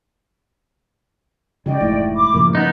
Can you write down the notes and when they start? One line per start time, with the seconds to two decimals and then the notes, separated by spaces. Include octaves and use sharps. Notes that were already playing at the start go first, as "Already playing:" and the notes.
1.66 C#3 G#3 F#4 D5 D#5 G5
1.80 F1 G#2 E3 A3 E4
2.14 B5 D6
2.34 G2 A#2 C#3 F3 A#4
2.55 B3 D#4 D#6